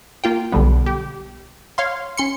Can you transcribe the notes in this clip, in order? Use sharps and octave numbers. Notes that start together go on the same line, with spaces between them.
A#3 F4 G5
B1 D3 G3 B3
G4
C#5 F5 C6
C#4 C6 C#7